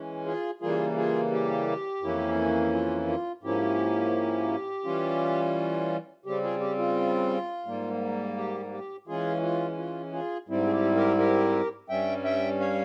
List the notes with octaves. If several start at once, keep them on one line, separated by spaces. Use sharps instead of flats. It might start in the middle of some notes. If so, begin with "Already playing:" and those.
Already playing: E3 G#3 C#4
F4 G#4
C#3 E3 G3 A#3 F4 G#4
F4 G#4
G4
F2 E3 A#3 C#4 E4
F4
F4
G#2 F3 A#3 C#4 E4 G4
E3 G3 C#4 F4
C#3 G3 C4 G4
F4 G#4
G4
F4
G#2 G3 A#3
G4
G4
E3 G#3 C#4 F4 G#4
F4
F4
F4 G#4
G#2 G3 C4 E4
G#4
G4
G4 A#4
G4 A#4
G2 G3 C#4 E5 G5
E5 G5
C#5 F5